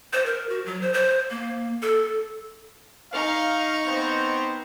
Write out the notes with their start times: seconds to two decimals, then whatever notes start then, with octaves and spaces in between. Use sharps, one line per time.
0.13 C5
0.26 A#4
0.49 F#4
0.66 F#3
0.82 C5
0.94 C5
1.30 A#3
1.82 A4
3.13 D#4 F5 C#6
3.85 B3 C4 C5